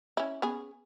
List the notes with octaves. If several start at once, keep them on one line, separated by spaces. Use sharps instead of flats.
C#4 E4
B3 C#4 G#4